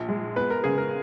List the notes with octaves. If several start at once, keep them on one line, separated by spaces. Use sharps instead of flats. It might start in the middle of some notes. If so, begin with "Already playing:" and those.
Already playing: A#1
G#3
B3 B4
A#4
C#3 G#4
A#4